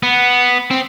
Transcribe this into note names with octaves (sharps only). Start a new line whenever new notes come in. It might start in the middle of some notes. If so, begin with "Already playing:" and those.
B3
C4